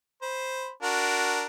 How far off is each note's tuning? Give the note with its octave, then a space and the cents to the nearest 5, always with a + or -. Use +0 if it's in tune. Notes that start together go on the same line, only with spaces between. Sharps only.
C5 +0 B5 +0
D4 +0 F#4 +0 A#4 +0